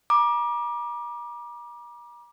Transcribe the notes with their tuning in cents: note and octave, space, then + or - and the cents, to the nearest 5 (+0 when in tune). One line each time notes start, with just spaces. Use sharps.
A#5 +40 D6 +15